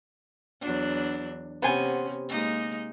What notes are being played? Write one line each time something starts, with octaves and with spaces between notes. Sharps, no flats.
E2 F#3 D4
C3 B3 C#4 C5 G#5
G#3 A#3 D#4